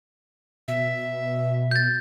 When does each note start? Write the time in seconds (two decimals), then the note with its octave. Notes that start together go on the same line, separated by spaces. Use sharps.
0.68 B2 E5
1.71 G6 A6